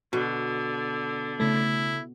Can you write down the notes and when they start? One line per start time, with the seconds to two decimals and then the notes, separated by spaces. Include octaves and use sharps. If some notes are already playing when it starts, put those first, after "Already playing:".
0.13 B2 D3
1.40 C#3 A3 E4